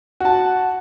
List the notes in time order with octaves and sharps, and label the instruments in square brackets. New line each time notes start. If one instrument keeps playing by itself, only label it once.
[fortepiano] F#4 A5